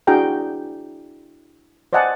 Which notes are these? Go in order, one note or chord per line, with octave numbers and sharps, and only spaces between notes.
D4 E4 F#4 G#4 G5 A#5
C5 D5 D#5 F#5 G#5 A5